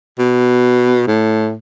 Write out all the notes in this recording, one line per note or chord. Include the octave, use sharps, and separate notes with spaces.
B2
A2